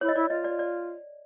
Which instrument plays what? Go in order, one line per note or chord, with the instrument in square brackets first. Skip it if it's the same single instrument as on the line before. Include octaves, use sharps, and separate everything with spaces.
[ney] E4 [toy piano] C#5
[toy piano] D#5
[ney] E4 [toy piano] D5
[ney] F4 [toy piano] D#5
[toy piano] D5
D5